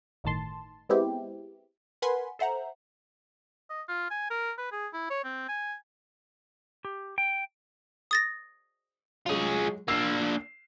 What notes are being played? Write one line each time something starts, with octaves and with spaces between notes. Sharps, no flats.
G1 A2 D#3 A5 C6
G#3 B3 C4 E4 G4
A#4 B4 F#5 G#5 B5 C6
A4 C5 E5 F#5 A#5
D#5
F4
G#5
A#4
B4
G#4
E4
C#5
C4
G#5
G4
G5
D#6 A6 A#6
F#3 G#3 F4 G#4
A#3 D4 E6 C7 E7